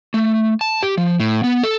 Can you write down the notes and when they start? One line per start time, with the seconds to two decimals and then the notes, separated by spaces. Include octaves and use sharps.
0.14 A3
0.61 A5
0.83 G4
0.98 F3
1.20 A2
1.44 B3
1.63 A4